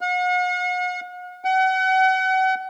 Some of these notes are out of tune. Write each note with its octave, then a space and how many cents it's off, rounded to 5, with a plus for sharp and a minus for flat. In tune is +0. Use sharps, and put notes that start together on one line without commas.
F#5 -40
F#5 +35